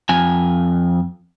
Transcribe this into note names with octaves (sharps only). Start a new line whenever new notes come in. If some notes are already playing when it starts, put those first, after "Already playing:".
F2 G#5